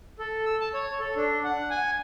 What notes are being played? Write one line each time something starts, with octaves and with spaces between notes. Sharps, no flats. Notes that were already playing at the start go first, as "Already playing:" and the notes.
A4
E6
A5
C#5
A4
D4
F#5
G#5